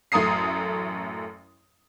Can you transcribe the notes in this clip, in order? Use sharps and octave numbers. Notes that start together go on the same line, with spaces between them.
A1 F#2 A3 A#5 D#6 C7